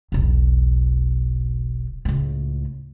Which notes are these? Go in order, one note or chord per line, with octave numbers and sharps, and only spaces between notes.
E1 B1
C#2 A2